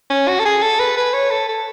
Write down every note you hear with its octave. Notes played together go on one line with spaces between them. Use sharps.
C#4
F#4
A4
G#4
A4
B4
B4
C#5
A4
A4